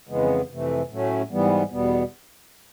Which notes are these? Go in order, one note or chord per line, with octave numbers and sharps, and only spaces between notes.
F2 C#3 E3 G#3 B3
F2 C3 E3 A3
A2 F#3 A3 C#4
G#2 E3 G3 B3
E2 B2 G3 B3